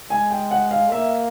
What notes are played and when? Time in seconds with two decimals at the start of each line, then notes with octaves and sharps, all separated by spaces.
0.10 G#3 G#5
0.31 G5
0.51 F#5
0.71 F5
0.91 A#3 E5